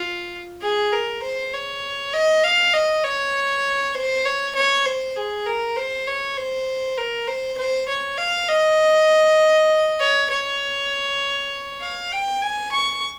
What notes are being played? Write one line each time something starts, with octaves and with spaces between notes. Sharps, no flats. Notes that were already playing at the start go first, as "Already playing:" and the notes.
Already playing: F4
G#4
A#4
C5
C#5
D#5
F5
D#5
C#5
C5
C#5
C#5
C5
G#4
A#4
C5
C#5
C5
A#4
C5
C5
C#5
F5
D#5
C#5
C#5
F5
G5
G#5
C#6